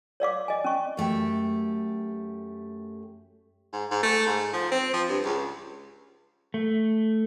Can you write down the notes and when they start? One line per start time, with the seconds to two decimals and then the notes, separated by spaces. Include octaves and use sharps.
0.20 C#5 D5 F5 D6
0.48 D#5 G#5
0.64 C#4 C#6
0.97 F#2 A3 G4 G5
3.73 G#2
3.91 G#2
4.03 A3
4.27 G#2
4.53 F3
4.72 C4
4.94 F3
5.09 G2
5.25 C#2
6.54 A3